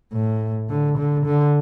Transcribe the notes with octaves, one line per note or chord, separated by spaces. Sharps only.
A2
D3
D3
D3